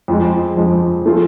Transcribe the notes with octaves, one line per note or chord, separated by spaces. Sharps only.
F2 F3 G#3
F2 F3 G#3
F3 A3 F4 G#4